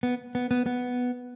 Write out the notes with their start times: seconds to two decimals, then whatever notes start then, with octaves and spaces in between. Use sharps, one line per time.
0.03 B3
0.35 B3
0.51 B3
0.66 B3